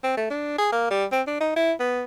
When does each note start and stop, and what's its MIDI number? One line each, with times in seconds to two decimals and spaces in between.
0.03 0.15 60
0.17 0.26 57
0.30 0.57 62
0.58 0.72 68
0.72 0.89 58
0.90 1.05 55
1.12 1.22 60
1.27 1.36 62
1.40 1.52 63
1.56 1.72 64
1.80 2.05 59